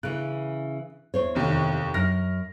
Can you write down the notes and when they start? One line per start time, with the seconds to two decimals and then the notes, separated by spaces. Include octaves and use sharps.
0.03 C#3 E3 F#6
1.14 E2 C5 C#5
1.35 F1 D#2
1.94 F#2 F6 A#6